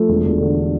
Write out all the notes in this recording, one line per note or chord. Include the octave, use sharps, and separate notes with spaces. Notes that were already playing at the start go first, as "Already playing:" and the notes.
Already playing: F3 A3
E1
E1
D3